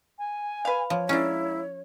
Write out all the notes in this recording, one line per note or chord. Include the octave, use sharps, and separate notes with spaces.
G#5
B4 F5
F3 C#5
G#3 A#3 C#4 D4 E4